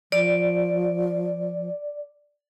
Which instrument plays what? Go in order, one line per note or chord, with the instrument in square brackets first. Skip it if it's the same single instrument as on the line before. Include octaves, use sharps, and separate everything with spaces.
[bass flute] F3 [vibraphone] D5